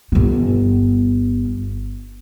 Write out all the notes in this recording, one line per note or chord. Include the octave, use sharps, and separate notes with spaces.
G1 B3